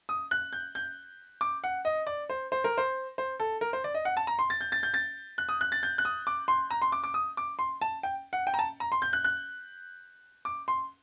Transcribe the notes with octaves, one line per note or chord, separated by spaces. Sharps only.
D#6
F#6
G6
G6
D6
F#5
D#5
D5
C5
C5
A#4
C5
C5
A4
A#4
C5
D5
D#5
F#5
A5
A#5
C6
A6
G6
A6
G6
A6
F#6
D#6
F#6
A6
G6
F#6
D#6
D6
C6
A#5
C6
D6
D6
D#6
D6
C6
A5
G5
F#5
G5
A#5
A5
A#5
C6
G6
F#6
F#6
D6
C6